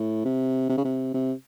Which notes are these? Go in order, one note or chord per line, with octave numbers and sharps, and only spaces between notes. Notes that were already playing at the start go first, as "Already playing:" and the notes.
Already playing: A2
C3
C3
C#3
C3
C3